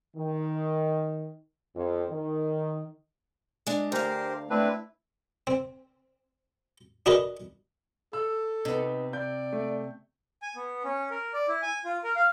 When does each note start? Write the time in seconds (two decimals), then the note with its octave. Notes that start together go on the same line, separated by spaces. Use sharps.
0.17 D#3
1.75 F2
2.10 D#3
3.67 G#3 D4
3.92 D2 G4 A#4 C5 F5
4.50 A3 C4 D4 E4 B4
5.47 C4
7.06 D4 F#4 G#4 A#4 B4 D#5
8.13 A4 E6
8.65 C3 B3 D#4
9.13 D5 G6
9.53 A3
10.42 G#5
10.56 B3
10.84 C#4
11.11 A#4
11.33 D5
11.48 E4
11.62 G#5
11.85 F4
12.04 A#4
12.16 F5